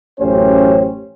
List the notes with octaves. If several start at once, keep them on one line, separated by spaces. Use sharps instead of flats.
A1 F#2 A3 C#4 G4 C5